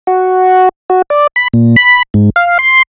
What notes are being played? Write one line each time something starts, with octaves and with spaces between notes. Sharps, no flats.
F#4
F#4
D5
B5
A#2
B5
G#2
F5
C6